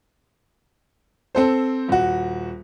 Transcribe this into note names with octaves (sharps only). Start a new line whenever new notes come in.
C4 A4 C5
D#1 F#4